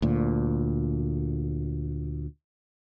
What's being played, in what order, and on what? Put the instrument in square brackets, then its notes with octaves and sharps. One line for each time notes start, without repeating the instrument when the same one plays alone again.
[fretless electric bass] D2 A#2